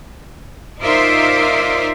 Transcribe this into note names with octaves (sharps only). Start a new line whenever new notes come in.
D#4 F4 A#4 C5 D5 E5